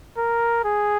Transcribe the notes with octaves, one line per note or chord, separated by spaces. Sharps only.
A#4
G#4